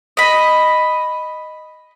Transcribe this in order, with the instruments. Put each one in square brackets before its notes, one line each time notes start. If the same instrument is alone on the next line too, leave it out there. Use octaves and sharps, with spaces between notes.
[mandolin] D#5 B5